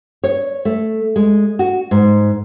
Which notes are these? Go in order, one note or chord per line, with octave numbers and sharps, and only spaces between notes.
C#5
A3
G#3
F#4
G#2